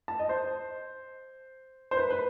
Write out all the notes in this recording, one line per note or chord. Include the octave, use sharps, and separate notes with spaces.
A5
D#5
C5
C5
B4
B4